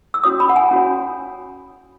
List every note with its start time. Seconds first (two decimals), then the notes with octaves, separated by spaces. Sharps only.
0.14 E6
0.23 C#4 F#4 C#5 D#6
0.40 B5
0.49 F#5
0.56 G#5
0.71 C#4 F#4 C#5